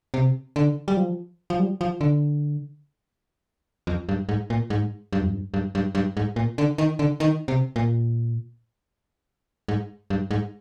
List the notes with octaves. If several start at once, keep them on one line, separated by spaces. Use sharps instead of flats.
C3
D3
G3
F3
F3
G3
F3
D3
F2
G2
G#2
A#2
G#2
G2
F2
G2
G2
G2
G2
G#2
A#2
D3
D#3
D3
D#3
C3
A#2
G#2
G2
G#2